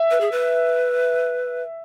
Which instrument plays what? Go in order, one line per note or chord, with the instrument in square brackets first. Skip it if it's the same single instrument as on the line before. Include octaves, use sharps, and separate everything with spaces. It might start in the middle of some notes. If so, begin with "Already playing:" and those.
Already playing: [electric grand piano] E5
[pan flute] B4
G#4
B4